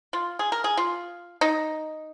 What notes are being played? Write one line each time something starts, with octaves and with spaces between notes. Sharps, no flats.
F4
G#4
A#4
G#4
F4
D#4